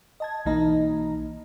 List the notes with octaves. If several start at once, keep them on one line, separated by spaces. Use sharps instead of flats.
D#5 A5 G#6
B1 E3 A#3 D#4 D#5 A#5